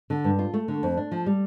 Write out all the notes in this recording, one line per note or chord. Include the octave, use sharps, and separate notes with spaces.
D3
G2
F4
A3
D3
F2
D4
F3
G3